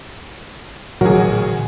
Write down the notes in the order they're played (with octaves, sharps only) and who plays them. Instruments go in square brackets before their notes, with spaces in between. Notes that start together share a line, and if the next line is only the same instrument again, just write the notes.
[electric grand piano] A1 A#4 [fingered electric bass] A#2 D3 E3 [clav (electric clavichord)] F#3 [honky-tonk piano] F#4 G#4